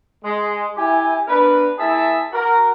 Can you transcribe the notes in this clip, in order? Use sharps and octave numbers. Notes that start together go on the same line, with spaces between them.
G#3
E4 G4 G#5
B3 D4 A#4 B4
A#3 E4 G#4 E5 G#5 A5
F#4 A#4